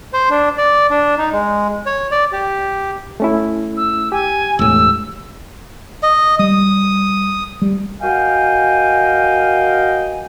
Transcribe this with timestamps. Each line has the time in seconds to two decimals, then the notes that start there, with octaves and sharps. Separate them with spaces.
0.13 C5
0.30 D4
0.58 D5
0.90 D4
1.18 D#4
1.33 G#3
1.86 C#5
2.11 D5
2.32 G4
3.20 A3 C#4 E4
3.77 E6
4.12 G4 G#5
4.59 E1 A2 E6
6.03 D#5
6.39 G3 D#6
7.62 G3
8.00 F#4 A#4 D#5 F5 G5 G#5